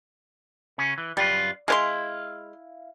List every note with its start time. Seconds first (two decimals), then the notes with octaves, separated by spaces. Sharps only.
0.78 C#3 C#4
0.98 E3
1.17 F#2 G3 F4 B4
1.68 G#3 E4 C5 F5 C6